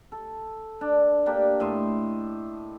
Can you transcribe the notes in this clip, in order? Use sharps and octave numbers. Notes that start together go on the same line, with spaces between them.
A4
D4
A#3 D4 G4
A2 D#5 E5 C6